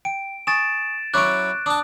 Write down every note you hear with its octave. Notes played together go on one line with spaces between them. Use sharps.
G5 D7
G#5 C#6 D#6 A6 D7 E7
F#3 C#4 E4 C#6 D6 F#6 D7
D4 A5 D6 D#6